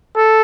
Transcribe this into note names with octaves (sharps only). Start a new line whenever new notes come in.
A4